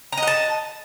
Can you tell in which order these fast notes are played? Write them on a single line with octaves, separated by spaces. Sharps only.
A#5 D#5 F#5 A5